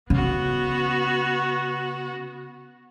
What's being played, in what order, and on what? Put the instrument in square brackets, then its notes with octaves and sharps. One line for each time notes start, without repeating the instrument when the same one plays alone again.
[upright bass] C#3 [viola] B3 F#4